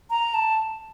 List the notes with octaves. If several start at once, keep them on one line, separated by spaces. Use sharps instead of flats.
A#5
A5